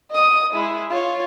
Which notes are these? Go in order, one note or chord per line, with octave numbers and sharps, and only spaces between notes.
D#5 D#6
G#3 E4
F4 C#5